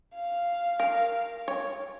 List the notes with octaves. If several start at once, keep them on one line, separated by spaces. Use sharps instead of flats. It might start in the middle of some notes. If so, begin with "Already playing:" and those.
F5
A#4
C#5